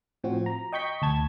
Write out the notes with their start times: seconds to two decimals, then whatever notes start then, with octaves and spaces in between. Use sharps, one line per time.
0.24 A2 F3 C4 F#4
0.46 A#5
0.73 D#5 G5 C#6 G6 B6
1.02 D2 A5 G#6